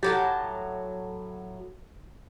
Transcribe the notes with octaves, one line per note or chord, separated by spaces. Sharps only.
A2 F#3 G4 A5